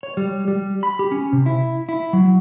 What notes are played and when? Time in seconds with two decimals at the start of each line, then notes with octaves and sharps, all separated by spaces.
0.03 C#5
0.17 G3
0.48 G3
0.83 B5
0.99 G4
1.12 C#4
1.33 C3
1.46 E4
1.89 E4
2.13 F#3